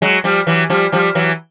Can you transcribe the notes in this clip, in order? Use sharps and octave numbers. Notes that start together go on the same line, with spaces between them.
F#3 G#3
F3 G3
E3 F#3
F3 G3
F3 G3
E3 F#3